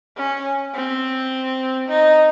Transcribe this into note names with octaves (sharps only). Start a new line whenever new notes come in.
C#4
C4
D#4